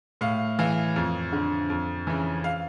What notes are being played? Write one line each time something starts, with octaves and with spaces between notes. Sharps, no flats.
A2 F5
E3 F5
F2
D3
F2
C#3 E3
F5